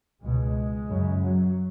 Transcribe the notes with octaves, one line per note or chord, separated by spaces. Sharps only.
C#2 B2 G#3
F#2 C#3
F#3